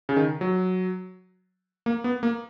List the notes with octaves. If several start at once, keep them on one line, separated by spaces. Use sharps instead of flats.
C#3
D#3
F#3
A#3
B3
A#3